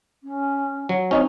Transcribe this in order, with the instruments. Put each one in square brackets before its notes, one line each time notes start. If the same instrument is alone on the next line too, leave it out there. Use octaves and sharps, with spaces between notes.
[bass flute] C#4
[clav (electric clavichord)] F#3
[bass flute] C4 [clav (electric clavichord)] C#4 D#4